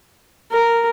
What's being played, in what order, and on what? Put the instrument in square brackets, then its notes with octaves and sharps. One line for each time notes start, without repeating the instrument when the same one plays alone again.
[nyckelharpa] A#4